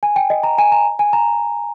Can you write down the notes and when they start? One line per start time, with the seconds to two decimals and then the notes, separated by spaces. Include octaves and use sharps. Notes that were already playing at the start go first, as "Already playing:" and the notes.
0.03 G#5
0.16 G5
0.30 D#5
0.43 A#5
0.58 G#5
0.72 A#5
0.99 G#5
1.13 A#5